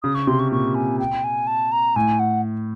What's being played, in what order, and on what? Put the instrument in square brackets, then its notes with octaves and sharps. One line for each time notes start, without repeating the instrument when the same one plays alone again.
[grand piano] C#3 [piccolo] D#6
[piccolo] C#6
[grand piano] C3 [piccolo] C6
[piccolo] C#6
[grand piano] A#2 [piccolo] C#6
[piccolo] G#5
G5
G#5
A5
A#5
[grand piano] A2 [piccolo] G#5
[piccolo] F#5